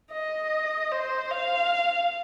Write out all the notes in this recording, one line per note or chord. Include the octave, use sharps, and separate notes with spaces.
D#5
C5
F5